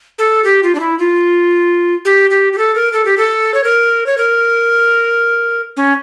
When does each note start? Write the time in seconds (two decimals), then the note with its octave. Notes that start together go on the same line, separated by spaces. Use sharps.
0.18 A4
0.44 G4
0.63 F4
0.75 D4
0.80 E4
0.99 F4
2.05 G4
2.30 G4
2.53 G4
2.58 A4
2.75 A#4
2.93 A4
3.05 G4
3.17 A4
3.54 C#5
3.64 A#4
4.06 C#5
4.18 A#4
5.77 C#4